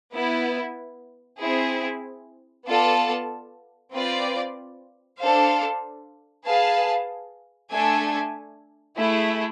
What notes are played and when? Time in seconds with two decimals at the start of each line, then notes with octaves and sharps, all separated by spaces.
0.13 B3 E4 B4
1.40 C4 E4 G#4
2.67 B3 F4 A4 D5 A5
3.92 C4 F4 B4 D5
5.18 D4 A4 C5 F5
6.45 G#4 B4 F5 A5
7.72 A3 D4 A4 E5 G#5
8.97 A3 E4 G#4